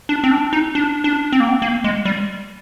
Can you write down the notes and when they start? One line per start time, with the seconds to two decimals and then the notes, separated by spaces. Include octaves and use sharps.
0.09 D4
0.24 C4
0.31 D4
0.53 D#4
0.75 D4
1.04 D4
1.32 C4
1.40 A#3
1.48 C4
1.62 A#3
1.84 G#3
2.05 G3